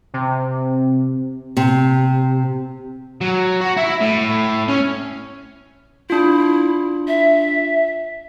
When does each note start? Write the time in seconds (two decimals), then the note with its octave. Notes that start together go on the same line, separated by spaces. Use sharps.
0.14 C3
1.57 C3
3.21 F#3
3.61 F#4
3.77 E4 E5
4.01 A2
4.68 C#4
6.10 D4 E4 F4
7.08 E5